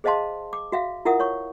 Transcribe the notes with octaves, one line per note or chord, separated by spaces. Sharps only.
G#4 C5 D#5 F5 A5 C6
D6
F#4 E5 F5
E4 F4 A#4 E5 F#5 D#6
C#5 C#6